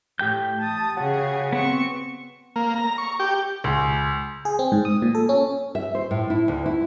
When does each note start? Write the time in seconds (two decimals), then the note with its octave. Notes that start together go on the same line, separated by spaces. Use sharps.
0.19 A2 G4 G5 G6
0.60 A5 D#6
0.97 C#3 F#4 G#4
1.53 B3 C4 C#6
2.56 A#3
2.76 A#5
2.98 C#6
3.20 G4
3.64 C#2
4.45 G#4
4.59 C4
4.72 G#2
4.85 D#6
5.02 A#2
5.15 A4
5.29 C#4
5.75 E5
5.95 C5
6.11 A2
6.30 E4
6.48 D2
6.66 E4